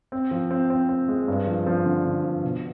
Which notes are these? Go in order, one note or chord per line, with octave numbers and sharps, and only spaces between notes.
C4
F3
C4
C4
C4
G#3
G2
F3
F3
D3
D3
F3
B2